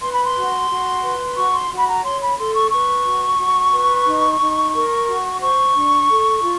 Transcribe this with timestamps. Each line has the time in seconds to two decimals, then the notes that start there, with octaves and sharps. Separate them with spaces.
0.02 B4 C6
0.12 B5
0.24 C6
0.36 F#4
0.70 F#4
1.03 B4
1.37 F#4 C#6
1.54 C6
1.71 F#4
1.77 B5
1.87 A#5
2.04 C#5 C6
2.21 B5
2.38 A4 C6
2.54 C#6
2.71 B4 C#6
3.06 F#4
3.38 F#4
3.73 B4
4.06 D#4
4.40 D#4
4.74 A#4
5.08 F#4
5.41 C5 C#6
5.75 D4
6.09 A4
6.41 F4